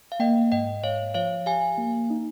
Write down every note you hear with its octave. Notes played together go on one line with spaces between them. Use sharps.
F5
A#3 D#5 G5
G#2 D#5 G5
G#2 C#5 F5
F3 C#5 F5
G4 F5 G#5
A#3
D#4